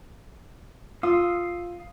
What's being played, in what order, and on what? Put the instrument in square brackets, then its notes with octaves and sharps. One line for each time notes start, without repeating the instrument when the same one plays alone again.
[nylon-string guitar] F4 [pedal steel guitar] F5 D#6 E6